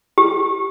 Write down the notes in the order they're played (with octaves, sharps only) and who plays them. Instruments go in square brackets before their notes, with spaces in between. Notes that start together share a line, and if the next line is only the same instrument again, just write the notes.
[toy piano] G4